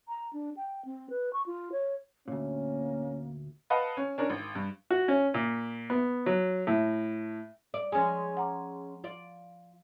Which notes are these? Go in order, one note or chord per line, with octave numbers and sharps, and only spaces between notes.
A#5
D4
G5
C4
B4
C#6
F4
C#5
D2 A#2 A#3 C#4
B4 D#5 F5 F#5 A5
C#4
C#4 D4 A#4
G#1
G2
F#4
C#4
A#2
B3
F#3
A2
D5
F3 G#3 C#4 G#5
F#5 A#5 D6
F4 D5